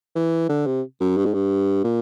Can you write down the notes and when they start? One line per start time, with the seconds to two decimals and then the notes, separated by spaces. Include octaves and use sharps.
0.16 E3
0.49 D3
0.67 C3
1.01 F#2
1.17 G2
1.26 G#2
1.34 G2
1.84 A#2